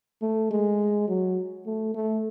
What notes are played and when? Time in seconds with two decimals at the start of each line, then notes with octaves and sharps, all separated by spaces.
0.22 A3
0.51 G#3
1.08 F#3
1.66 A3
1.94 A3